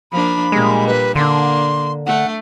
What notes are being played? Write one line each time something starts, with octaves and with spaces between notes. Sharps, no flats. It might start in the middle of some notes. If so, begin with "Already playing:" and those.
F3 A#3 D4 B5
A#2 G3 G#3
B4
D3 A#3 D4 C6
A3 F#5